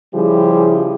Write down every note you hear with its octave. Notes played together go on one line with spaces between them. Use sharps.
C#3 F3 G3 E4 G4 G#4